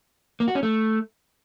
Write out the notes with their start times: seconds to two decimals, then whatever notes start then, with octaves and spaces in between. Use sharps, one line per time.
0.40 A#3
0.48 F#4
0.55 C#4
0.63 A3